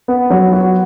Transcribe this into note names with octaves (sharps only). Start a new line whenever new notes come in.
B3
F#3
F#4